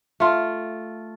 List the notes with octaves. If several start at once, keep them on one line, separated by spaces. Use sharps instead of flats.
A3 F4